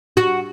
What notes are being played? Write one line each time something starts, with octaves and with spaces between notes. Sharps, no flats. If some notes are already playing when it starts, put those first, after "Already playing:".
F#4